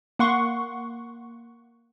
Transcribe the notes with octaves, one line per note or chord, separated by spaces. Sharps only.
A#3 F#5 C6 C#6